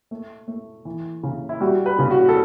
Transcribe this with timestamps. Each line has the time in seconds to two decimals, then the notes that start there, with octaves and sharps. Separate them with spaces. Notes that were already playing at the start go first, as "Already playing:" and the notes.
0.11 A3
0.48 A3
0.85 E3
1.23 C#3
1.49 E4
1.60 G3 F#4
1.86 B4
1.99 C#3
2.11 F#4
2.29 A4